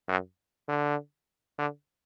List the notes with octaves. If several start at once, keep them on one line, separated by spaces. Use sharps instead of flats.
F#2
D3
D3